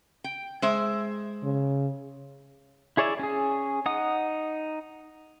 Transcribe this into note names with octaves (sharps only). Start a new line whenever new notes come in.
G5
G#3 C5 E5
C#3
E4 G#4 C#5 D5 E5
C#4 G#4
D#4 F#5 D#6